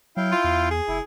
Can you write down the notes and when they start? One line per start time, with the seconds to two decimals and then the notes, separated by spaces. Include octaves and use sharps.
0.17 F#3 E4 F5 G5
0.32 F4
0.44 E2
0.71 G#4
0.88 F1 E4